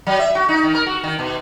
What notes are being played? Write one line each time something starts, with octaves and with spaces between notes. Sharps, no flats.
F#3
E5
F#4
D#4
D#3
A#4
F#4
D#3
B2